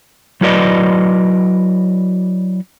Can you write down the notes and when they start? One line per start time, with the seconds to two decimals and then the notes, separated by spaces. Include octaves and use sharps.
0.41 F#3 E4 F#4 B4 D5 D#5